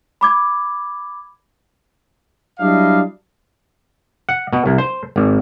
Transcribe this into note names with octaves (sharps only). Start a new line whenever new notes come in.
B5 D6 G#6
F#3 G3 D4 E4 D#5 F5
F#5
B2
C2
C5
G#1